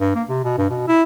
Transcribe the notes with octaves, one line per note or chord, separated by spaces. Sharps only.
G2
A#3
C3
B2
G2
B2
E4